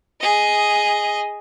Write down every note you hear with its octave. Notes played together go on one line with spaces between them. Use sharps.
G#4 D#5